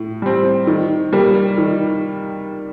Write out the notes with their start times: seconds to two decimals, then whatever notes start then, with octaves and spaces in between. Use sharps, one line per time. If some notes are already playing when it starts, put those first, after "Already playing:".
Already playing: A2
0.22 G3 C4
0.67 D#3
1.13 G3 A#3
1.58 D#3